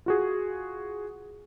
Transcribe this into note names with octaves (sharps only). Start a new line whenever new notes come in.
F4 F#4 G#4